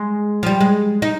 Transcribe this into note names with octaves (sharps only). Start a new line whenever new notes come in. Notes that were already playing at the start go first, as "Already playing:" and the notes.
Already playing: G#3
F3
G3
G#3
D#4